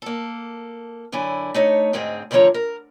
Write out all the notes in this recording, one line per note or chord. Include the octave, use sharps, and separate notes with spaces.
A#3 A4
F#2 D3 E4 G#5
A3 D#4 C#5
D2 G#2 G#3 C4 G#4
D2 D3 D#3 F3 C#5 A#5
A#4